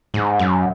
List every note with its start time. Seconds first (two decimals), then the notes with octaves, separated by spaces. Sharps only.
0.14 G#2
0.39 F#2